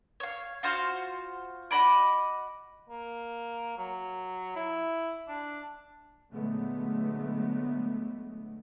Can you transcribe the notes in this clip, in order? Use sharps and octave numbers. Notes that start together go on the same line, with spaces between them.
C#5 F5
F4 F#4 C5 F5
F#4 D#5 B5 D6
A#3
F#3
E4
D4
A#2 D3 F#3 G#3 A3 B3